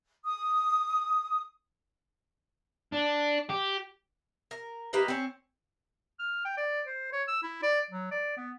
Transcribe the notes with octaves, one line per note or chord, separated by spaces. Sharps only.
D#6
D4
G4
A#4
A#3 G4 B4 D#5
C4 C#4
F6
G5
D5
C5
C#5
E6
E4
D5
F#3
D5
B3